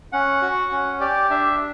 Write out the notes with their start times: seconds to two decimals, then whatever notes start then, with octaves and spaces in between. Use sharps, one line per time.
0.12 C#4 F#5
0.42 F#4
0.71 C#4
1.00 G4 D5
1.30 D4 E5